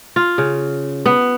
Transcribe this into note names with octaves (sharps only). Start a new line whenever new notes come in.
F4
C#3
B3